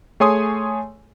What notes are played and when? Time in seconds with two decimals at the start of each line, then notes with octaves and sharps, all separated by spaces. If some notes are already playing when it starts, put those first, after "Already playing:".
0.20 A3 G#4 C#5 G#5 C6 D#6